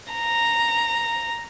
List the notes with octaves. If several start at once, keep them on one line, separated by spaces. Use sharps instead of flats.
A#5